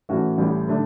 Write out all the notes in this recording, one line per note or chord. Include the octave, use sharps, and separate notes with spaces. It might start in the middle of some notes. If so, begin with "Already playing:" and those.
A2 E3 A3 C#4 F#4
A1 A2 G3
D3 A3 D4